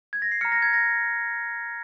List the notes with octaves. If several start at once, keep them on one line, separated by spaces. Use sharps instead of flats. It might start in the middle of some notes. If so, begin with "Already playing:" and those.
G#6
A#6
C7
A#5 F6 C#7
A#6
G#6
A#6